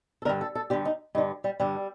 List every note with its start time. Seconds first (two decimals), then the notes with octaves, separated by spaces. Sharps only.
0.22 A4
0.25 G2 D3 A#4
0.41 A4
0.55 A4
0.70 G2 D3 G4
0.85 D#4
1.15 G2 D#4
1.18 D3
1.44 G3
1.60 G2 D3 G3